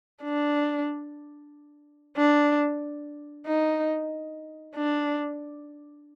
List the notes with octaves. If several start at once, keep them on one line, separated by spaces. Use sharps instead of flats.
D4
D4
D#4
D4